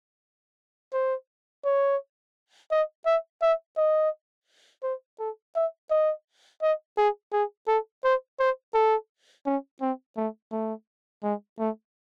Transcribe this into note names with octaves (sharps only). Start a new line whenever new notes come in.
C5
C#5
D#5
E5
E5
D#5
C5
A4
E5
D#5
D#5
G#4
G#4
A4
C5
C5
A4
C#4
C4
A3
A3
G#3
A3